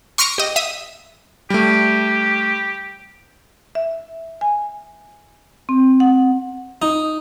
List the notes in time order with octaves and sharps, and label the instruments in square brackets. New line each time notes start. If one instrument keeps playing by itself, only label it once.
[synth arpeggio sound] C6 C#6 F6 A#6 C#7 D7
G4 D#5
E5 D#6
[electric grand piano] G3 A3 [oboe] G4
[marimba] E5
G#5
C4
F#5
[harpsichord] D#4